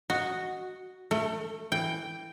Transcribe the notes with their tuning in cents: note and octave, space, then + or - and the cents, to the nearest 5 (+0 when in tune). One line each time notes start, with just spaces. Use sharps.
F#4 +0 D#5 +0
A3 +0 A4 +40
E3 +0 G5 +0